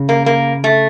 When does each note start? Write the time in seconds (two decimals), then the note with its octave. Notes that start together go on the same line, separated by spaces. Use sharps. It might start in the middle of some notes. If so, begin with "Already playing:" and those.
Already playing: C#3
0.09 A#3
0.26 A#3
0.64 A3